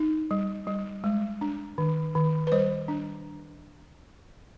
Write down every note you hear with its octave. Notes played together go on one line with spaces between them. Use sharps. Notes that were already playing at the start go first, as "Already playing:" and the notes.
Already playing: D#4
G3
G3
G#3
D4
D#3
D#3
B4
G3 C5
D4